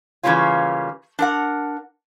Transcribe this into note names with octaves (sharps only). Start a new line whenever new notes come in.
C#3 E3 G3 A#3 C#4 F4
D4 A#4 F#5